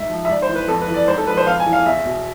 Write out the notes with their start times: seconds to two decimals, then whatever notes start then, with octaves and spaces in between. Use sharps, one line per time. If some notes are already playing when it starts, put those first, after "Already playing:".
Already playing: G#2 E5
0.09 F3
0.25 E5
0.29 G#2 D5
0.42 C5
0.49 E3
0.55 B4
0.68 F2 A4
0.82 B4
0.88 E3
0.94 D5
1.08 G#2 C5
1.17 A4
1.27 F3 B4
1.37 C5
1.47 F2 F5
1.60 G#5
1.66 E3
1.73 F5
1.86 E2 E5
2.05 B2